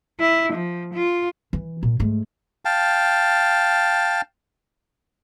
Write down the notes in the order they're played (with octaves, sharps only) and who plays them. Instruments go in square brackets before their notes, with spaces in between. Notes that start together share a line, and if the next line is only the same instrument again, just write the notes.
[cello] E4
F3
F4
[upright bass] E3
A#2
G#2 A3
[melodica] F5 G5 A5